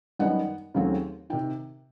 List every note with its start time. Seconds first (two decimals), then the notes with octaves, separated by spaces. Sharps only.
0.19 F#2 D#3 G3 B3 D#4 F#5
0.74 D#2 C#3 F#3 A3 C4
1.30 C3 D#3 G5